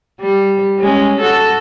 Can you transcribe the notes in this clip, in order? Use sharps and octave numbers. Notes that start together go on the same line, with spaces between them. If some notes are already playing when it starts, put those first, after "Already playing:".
G3
G#3 C#4
F#4 A4